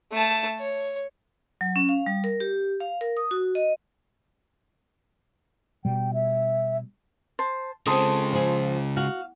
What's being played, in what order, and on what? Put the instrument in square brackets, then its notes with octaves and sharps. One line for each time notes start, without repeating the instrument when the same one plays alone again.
[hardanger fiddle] A3 A5
C#5
[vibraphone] F#3
C#4
F5
G3
A#4
G4
F5
A#4
D#6
F#4
D#5
[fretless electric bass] B2 G3 [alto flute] G5
[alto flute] E5
[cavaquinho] C5 A5
[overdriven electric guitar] C#3 G#3 [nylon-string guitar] C4 A4 [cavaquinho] A5 C6 D#6
[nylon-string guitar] F3 G#4
[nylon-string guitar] F#4 [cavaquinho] F5